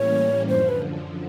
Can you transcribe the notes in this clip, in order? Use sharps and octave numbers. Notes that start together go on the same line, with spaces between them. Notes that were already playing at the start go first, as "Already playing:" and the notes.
Already playing: A2 E3 G3 A#3 C#4 C#5
F#2 D3 F3 C5
B4